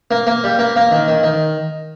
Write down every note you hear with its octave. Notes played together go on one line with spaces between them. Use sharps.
A#3
A#3
G3
A#3
A#3
D#3
D#3
D#3